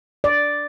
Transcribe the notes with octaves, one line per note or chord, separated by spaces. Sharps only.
D5